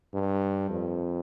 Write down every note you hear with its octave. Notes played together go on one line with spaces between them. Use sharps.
G2
F2